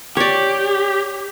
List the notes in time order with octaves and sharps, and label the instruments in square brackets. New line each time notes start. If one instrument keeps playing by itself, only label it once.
[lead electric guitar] G4 [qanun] C#5 D5